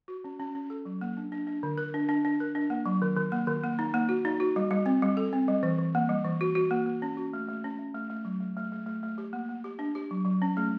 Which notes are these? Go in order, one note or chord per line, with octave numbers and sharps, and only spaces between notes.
F#4
C#4
C#4
C#4
A4
F#3
A#3
D4
D4
D4
D3
A#4
D4
D4
D4
A#4
D4
A#3
F#3
D#3
D#3
A#3
D#3
A#3
D#4
A#3
F#4
D#4
F#4
G3
G3
C4
G3
A4
C4
G3
E3
E3
A#3
G3
E3
F#4
F#4
A#3
A#3
C#4
F#4
A3
A3
C#4
A3
A3
A3
F#3
A3
A3
A3
A3
A3
G4
A#3
A#3
G4
D4
G4
F#3
F#3
C#4
A3